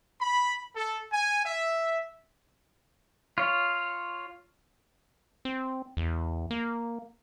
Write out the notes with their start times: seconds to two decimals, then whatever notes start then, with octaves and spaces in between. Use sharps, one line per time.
0.20 B5
0.76 A4
1.11 G#5
1.45 E5
3.38 F4 C#5
5.45 C4
5.97 E2
6.51 A#3